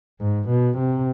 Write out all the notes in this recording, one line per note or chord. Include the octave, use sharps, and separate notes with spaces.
G#2
B2
C3